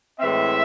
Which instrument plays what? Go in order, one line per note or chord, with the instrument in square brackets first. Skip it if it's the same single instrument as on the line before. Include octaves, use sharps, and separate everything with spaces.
[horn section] A2 E3 G#3 C4 E5